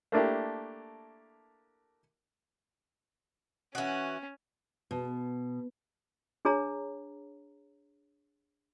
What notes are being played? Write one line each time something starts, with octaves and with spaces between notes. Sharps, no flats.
A3 A#3 D4 E4 G4
E3 C#4 F#4
B2
D4 G#4 C#5 A#5